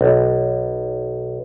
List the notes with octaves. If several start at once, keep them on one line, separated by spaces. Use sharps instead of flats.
B1